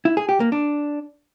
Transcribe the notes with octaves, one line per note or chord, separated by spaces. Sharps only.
E4
G#4
G4
A#3
D4